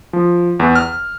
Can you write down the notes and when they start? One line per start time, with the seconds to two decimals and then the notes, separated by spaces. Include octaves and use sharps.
0.13 F3
0.60 E2
0.75 F6